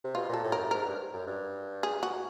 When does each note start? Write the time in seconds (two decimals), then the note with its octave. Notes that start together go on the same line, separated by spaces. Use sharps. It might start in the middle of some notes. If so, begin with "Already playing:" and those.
0.04 C3
0.15 B2 F4
0.29 A#2 A4
0.43 A2
0.52 F#2 A#4
0.65 A2
0.71 G#2 A#4
0.85 G2
1.14 F#2
1.27 G2
1.83 G#4
2.03 F#4